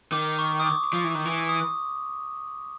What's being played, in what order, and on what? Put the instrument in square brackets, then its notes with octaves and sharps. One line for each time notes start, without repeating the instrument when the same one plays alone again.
[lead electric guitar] D#3 [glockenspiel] D6
[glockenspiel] C#6
D#6
D6
[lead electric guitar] F3
E3
D#3
E3
[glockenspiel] D#6